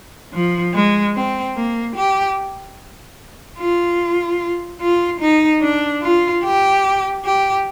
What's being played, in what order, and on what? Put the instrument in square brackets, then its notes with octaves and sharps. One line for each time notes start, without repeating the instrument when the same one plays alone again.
[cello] F3
G#3
C4
A#3
G4
F4
F4
D#4
D4
F4
G4
G4